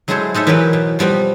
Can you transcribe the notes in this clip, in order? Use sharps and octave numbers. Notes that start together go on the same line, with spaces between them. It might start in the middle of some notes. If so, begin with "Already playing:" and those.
F#3 G#3 E4 G#4 A4 C5
G#3 D#4 A4 E5
E3 F#3 G4 A#4 B4
B2
F3 G3 B3 C4